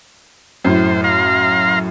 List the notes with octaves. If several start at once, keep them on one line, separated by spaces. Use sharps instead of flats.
F#2 A2 C5
F5 A#5 C6